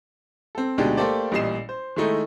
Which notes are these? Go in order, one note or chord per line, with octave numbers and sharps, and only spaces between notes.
C4 A4
D2 B2 G#3 D4 D#4 G4
A3 A#3 G4 A4 C5 D5
A1 A#2 G3 D#5 C7 E7
C5
D#3 G#3 A3 D#4 E4